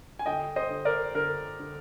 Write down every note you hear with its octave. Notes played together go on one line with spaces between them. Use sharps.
G#5
D3 D#5 G5
C5 D#5
D3
A#4 D5
D3 A#4
D3